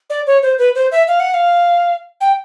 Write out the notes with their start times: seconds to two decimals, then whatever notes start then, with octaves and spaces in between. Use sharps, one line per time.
0.10 D5
0.27 C#5
0.43 C5
0.58 B4
0.75 C5
0.92 E5
1.08 F5
1.20 F#5
1.34 F5
2.21 G5